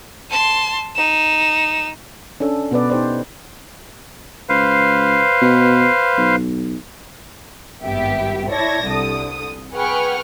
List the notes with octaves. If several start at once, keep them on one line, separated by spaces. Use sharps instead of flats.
A5 C6
D#4 E7
C#4 D4 A4
B2 B3 B4 D5
D#4 G4 C5 D5
C#2 B4 C5 F5
B2
B1
G#1 G2 B3 G4 E5
E4 C#5 D5 A5 G#6 A#6
C2 D3 D#6
G#4 B4 F#5 G5 C#6 F6